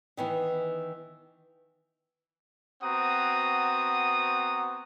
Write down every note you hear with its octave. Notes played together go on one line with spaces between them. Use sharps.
D#3 E3 B3
B3 C4 F#4 F#5 A#5 D#6